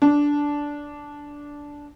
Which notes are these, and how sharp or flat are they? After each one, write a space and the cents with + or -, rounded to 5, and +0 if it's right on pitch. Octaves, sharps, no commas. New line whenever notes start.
D4 -10